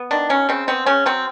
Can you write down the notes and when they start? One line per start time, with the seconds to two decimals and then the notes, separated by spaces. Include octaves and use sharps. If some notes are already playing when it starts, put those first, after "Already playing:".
Already playing: B3
0.11 D#3 D4
0.29 F#3 C#4
0.49 C#3 C4
0.68 B3 C4
0.86 C#3 C#4
1.06 F#3 C4